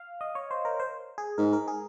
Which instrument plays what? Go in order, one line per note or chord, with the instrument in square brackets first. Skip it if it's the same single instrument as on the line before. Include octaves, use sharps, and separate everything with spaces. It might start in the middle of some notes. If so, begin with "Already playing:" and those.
Already playing: [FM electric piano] F5
D#5
C#5
C5
A#4
C5
G#4
[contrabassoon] G#2 [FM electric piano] A#4
[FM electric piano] A#4
G#4